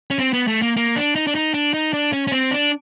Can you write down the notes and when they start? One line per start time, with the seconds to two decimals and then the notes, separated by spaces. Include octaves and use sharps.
0.11 C#4
0.19 C4
0.33 B3
0.48 A3
0.62 A#3
0.76 A#3
0.96 D4
1.16 D#4
1.27 D4
1.35 D#4
1.54 D4
1.74 D#4
1.93 D4
2.13 C#4
2.27 C#4
2.32 C4
2.51 D4